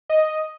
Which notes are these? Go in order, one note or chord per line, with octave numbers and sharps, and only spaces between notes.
D#5